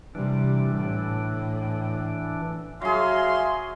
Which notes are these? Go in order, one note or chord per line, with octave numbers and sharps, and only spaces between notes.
C3 E3 G3 D4
A2
F#3 G#4 E5 F5 C6